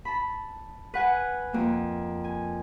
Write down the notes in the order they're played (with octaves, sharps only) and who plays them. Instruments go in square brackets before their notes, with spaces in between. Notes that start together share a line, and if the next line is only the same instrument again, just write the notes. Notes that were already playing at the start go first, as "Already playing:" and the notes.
[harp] A5 B5
B4 F#5 G#5
F2 A#3
G#5